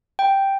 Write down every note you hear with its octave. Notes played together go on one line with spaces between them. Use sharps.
G5